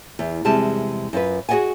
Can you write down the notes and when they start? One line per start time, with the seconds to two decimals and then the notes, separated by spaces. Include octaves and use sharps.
0.19 E2
0.45 E2 C3 G3 G#3 A5
1.13 F#2 F4 B4
1.49 F#4 G#4 D5 D#5 F#5 G#5